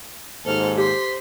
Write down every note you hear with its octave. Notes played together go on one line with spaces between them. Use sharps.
D#2 G#2 A4 C5 F6
G4 C6 B6